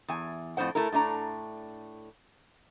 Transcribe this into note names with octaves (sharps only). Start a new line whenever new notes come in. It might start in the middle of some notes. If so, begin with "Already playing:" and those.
E2 G#5
F2 A2 B3 C5 F#5
A3 E4 A#4
A2 A3 D4 A#5